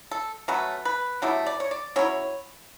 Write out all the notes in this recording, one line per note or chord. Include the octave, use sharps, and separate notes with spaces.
A4
F#3 A3 C#4 B4
B4
B2 F#3 A3 E4 G4
D5
C#5
D5
F#3 C#4 E4 C#5